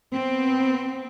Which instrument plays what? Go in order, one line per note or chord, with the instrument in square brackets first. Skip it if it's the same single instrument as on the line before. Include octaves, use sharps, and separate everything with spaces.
[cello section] B3 C4